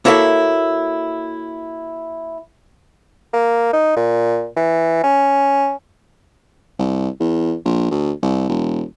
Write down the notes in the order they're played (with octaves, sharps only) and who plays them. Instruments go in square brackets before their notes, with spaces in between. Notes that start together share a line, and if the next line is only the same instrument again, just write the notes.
[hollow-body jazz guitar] A#3 E4 F#4 A4 C#5 E5
[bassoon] A#3
D#4
A#2
E3
C#4
[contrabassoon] C2
E2
A#1
D2
C2
E1